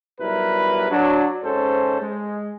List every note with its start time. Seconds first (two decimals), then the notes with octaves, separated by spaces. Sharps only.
0.20 B1 G3 E4 A#4 B4
0.90 F#3 D4
1.43 G#2 C#4 A4 C5
2.01 G#3